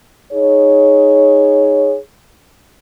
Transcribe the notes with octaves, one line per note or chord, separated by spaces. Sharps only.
D#4 G#4 C#5